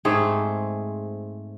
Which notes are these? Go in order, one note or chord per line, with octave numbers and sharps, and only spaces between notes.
G#2 A3 C4 G#4